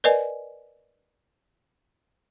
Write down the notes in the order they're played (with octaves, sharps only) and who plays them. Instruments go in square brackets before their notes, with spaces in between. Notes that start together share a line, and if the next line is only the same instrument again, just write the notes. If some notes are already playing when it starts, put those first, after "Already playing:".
[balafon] A#4 B4 D5 D#5 G#5